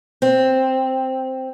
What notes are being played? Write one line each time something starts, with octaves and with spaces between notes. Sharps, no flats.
C4